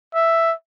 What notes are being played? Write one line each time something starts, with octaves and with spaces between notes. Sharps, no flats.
E5